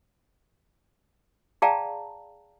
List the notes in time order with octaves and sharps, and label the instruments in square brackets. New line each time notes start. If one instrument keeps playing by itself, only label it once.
[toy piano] G#4 D5 F5 G5 A5 A#5